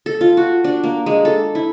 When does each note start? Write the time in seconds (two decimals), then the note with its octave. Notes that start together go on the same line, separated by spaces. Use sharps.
0.06 A4
0.21 F4
0.37 F#4
0.64 D4
0.84 A#3
1.06 G#3
1.25 A4
1.55 E4